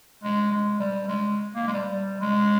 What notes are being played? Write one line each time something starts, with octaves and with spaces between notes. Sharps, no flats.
G#3
G#3
G3
G#3
A#3
G#3
G3
G3
G#3